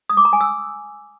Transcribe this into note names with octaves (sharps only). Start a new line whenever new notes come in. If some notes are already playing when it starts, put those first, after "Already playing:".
D#6
D6
A#5
G#5
E6